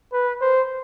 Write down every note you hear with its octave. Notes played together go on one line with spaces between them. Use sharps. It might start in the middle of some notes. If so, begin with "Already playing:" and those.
B4
C5